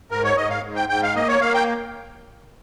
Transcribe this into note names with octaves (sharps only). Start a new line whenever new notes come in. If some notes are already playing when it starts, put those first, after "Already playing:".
G#2 A#4
C#5
G#2 D#5
F5
G#2
G5
G#2 G5
F5
A#3 D#5
C#5
A#3 F5
G5